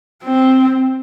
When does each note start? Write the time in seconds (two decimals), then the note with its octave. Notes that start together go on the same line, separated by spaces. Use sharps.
0.24 C4